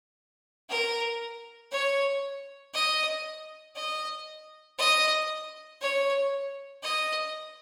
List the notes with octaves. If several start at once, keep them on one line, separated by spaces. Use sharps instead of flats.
A#4
C#5
D#5
D#5
D#5
C#5
D#5